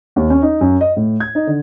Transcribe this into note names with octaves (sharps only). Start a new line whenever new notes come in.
D#2
C#4
D#4
F#2
D#5
A2
G#6
D#4
D3